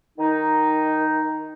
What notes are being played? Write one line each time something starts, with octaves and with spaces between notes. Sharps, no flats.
D#3 D#4